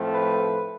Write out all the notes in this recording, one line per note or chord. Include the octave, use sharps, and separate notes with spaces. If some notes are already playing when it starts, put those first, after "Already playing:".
Already playing: A2 F3 A3 C4
B4